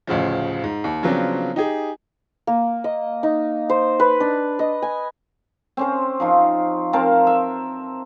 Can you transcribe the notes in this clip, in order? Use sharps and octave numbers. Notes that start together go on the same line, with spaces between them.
A1 D2 C#3 F3
G#2
D#2
C#3 F3 F#3 B3 C4 D4
D#4 G4 G#4
A#3
D#5
D#4
C5
B4
D4
D#5
G#5
C4 C#4 C5
F3 D#4 F4
C4 A#4 F5 A5
E5